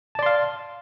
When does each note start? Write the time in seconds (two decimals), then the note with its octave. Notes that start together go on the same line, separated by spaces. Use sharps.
0.15 A5
0.19 D5
0.23 C6
0.26 F5